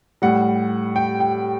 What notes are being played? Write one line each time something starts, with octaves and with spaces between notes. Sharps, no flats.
A2 G3 F#5
G5
G5